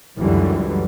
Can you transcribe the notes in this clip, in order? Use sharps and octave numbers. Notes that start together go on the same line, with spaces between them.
C#2 F#2 D3 E3 F#3 G3